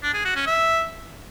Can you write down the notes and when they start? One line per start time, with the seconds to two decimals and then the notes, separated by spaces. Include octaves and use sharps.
0.03 D4
0.14 G#4
0.25 F#4
0.36 C#4
0.47 E5